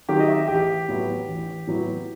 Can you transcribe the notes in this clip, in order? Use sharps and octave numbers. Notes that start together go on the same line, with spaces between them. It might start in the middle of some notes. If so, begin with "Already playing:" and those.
D#3 F#3 G4
D#5
E5
A1 G4
A2 F#3 B3 E4
A1
A2 F#3 B3 E4